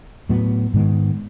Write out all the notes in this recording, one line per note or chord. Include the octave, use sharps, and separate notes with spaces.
A2 F#3 B3
G#2 D#3 G#3 B3